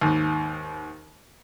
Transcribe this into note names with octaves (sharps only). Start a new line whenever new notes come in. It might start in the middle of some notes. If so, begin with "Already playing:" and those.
D#2 G#2